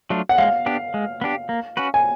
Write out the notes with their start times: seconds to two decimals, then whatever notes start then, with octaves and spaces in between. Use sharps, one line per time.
0.10 F#3 A3 D4 F4
0.29 F#5
0.38 G#3 F5
0.66 B3 D4 G4
0.94 G#3
1.21 B3 D4 G4
1.49 A#3
1.77 C#4 F#4 B4
1.94 G#5